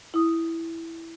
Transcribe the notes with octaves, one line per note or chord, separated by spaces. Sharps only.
E4 D#6